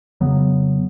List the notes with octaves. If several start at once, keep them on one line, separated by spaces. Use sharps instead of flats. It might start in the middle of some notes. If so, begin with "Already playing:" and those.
F2 C#3 F#3 B3